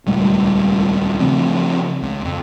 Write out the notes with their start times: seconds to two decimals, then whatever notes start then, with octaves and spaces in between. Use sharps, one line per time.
0.07 D#1 C#2 G3 A3
1.20 C#3 F3 A3 C4
2.02 C#2
2.25 F2